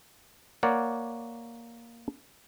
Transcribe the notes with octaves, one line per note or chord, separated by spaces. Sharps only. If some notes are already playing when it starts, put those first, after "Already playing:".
A#3 A#4 C#5 D5 F#5